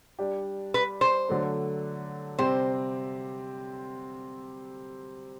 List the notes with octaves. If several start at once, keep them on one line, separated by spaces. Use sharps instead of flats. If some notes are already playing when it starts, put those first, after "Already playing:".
G3 D4 G4
B4
C5
D3 F#3 A3 D4
C3 G3 C4 G4 C5